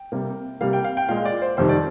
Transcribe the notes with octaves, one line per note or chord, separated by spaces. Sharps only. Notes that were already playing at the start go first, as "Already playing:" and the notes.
Already playing: G5
C3 G3 A#3
C3 G3 A#3 F5
G5
F5
G5
A#2 G#3 F5
D5
C5
F2 C3 D#3 G3 C5
D5